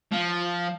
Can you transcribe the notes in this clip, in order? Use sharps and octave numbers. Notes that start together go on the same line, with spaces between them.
F3